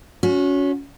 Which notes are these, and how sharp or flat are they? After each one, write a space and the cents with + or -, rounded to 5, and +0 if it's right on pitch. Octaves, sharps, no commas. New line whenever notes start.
C#4 +20 F#4 -25